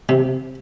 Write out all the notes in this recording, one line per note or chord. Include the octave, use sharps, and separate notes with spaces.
C3